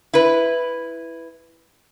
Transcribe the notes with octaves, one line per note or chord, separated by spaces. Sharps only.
E4 B4